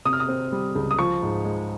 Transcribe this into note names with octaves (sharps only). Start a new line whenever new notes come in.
C3 D#6
F6
D#6
C4
G3
C#2
D#6
F3 C#6
G#2
G#3